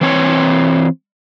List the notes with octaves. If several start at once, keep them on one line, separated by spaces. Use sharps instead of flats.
E3 C4 C#5